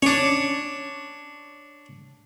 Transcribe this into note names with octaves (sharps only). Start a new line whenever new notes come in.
C#4 D4 C#5